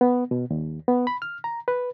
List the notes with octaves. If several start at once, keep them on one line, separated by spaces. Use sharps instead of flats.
B3
B2
D#2
B3
B5
F6
A#5
B4